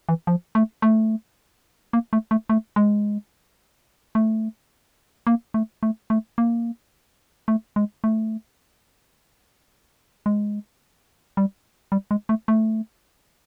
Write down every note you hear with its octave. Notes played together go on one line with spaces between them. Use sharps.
E3
F3
A3
A3
A#3
A3
A3
A3
G#3
A3
A#3
A3
A3
A3
A#3
A3
G#3
A3
G#3
G3
G3
G#3
A3
A3